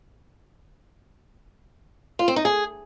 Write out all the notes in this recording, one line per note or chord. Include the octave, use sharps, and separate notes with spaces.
F4
C4
D#4
G#4